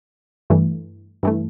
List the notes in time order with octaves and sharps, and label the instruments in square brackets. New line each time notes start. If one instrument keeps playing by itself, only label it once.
[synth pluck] G2 E3 A3
G2 E3 A3